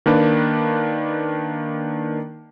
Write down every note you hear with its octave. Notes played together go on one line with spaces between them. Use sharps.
D#3 A#3 D4 B4